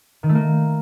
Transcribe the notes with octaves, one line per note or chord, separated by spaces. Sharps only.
D#3
A3
A#3